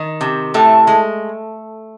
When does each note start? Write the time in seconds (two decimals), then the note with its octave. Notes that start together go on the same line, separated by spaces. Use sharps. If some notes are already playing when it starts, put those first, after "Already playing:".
Already playing: D#3
0.21 C3
0.54 A2 A3
0.87 G#3